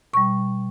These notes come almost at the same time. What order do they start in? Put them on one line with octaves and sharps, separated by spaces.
B2 C#6 G3